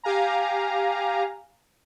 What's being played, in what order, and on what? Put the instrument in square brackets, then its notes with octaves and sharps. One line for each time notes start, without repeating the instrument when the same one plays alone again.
[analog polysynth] G4 F5 G#5 A#5